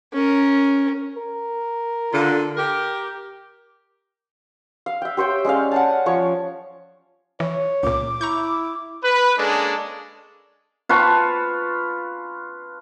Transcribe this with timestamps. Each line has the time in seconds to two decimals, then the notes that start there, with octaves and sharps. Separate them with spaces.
0.13 C#4 A#4
1.17 A#4
2.12 D3 F4
2.57 G4 A#4
4.86 F5
5.02 E5 G5
5.17 G4 C5 C#5 G5
5.45 G#3 C#4 D5 F5
5.72 F#5 G#5 A5
6.06 F3 C#5 C#6
7.40 E3 C#5
7.83 C#2 A#2 D6
8.21 E4 A#5 C#6 G6
9.03 B4
9.38 G#3 A#3 C#4 D4 G#4 A4
10.89 F4 B4 A5 C#6